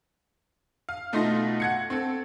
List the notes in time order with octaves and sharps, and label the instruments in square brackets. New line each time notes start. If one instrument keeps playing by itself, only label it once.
[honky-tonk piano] F5
B2 A3 D#4 F4 C6 A#6
F#5 G#6 C#7
C4 A4